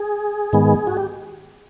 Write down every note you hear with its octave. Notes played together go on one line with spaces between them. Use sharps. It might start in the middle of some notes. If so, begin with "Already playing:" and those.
Already playing: G#4
G#2 D#3 G#3 B3
F#4
G4